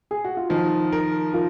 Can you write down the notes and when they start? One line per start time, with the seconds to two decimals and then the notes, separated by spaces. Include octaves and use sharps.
0.11 G#4
0.24 F#4
0.37 F4
0.49 D#3 F3 D#4
0.92 A#4
1.33 F3 F4 A#4